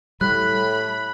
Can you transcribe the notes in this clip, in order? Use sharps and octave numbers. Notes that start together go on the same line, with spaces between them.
A2 G3 B5 F#6